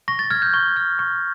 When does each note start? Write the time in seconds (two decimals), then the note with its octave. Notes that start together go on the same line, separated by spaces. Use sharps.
0.08 C#6 A#6
0.19 A6
0.31 F6 G#6
0.42 G6
0.54 C#6
0.76 F6
0.99 C#6